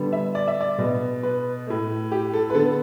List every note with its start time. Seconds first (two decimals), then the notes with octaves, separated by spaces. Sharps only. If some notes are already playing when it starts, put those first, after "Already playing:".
Already playing: D3 G3 B3
0.12 E5
0.35 D5
0.48 E5
0.61 D5
0.78 B2 B3
1.23 B4
1.67 A2 A3
2.12 G4
2.34 A4
2.50 B4
2.54 D3 B3 A4